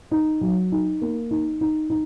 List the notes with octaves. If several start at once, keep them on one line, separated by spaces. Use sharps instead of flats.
D#4
F#3
D#4
A#3
D#4
D#4
D#4